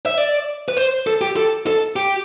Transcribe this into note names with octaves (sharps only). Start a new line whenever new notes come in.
E5
D5
B4
C5
A4
G4
A4
A4
G4